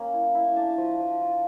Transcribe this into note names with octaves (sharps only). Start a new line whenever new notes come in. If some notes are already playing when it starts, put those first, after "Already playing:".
Already playing: A#3 C#4
E4
E4
D4 A5
F3
F3
F4